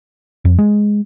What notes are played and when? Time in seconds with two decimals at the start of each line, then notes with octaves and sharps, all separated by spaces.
0.45 F2
0.58 G#3